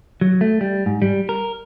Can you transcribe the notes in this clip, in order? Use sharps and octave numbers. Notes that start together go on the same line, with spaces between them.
F#3
A3
G3
G#2
G3
A#4